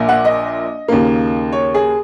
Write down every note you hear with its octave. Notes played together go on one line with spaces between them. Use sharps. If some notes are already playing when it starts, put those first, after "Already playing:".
Already playing: A#1 A#2 A#3
F#5
D#5
D#2 C#3 A#3
C#5
G#4